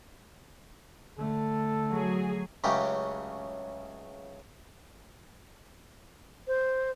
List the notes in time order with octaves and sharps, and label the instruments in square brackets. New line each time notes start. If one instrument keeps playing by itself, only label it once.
[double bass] D3 A3 [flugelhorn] A4
[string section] F#3 G#4
[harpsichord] C#2 C#3 F#3 A3 G4 G5
[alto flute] C5